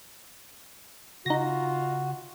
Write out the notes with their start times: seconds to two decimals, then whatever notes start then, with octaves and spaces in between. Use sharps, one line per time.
1.26 C#3 D#4 F4 F#4 A#6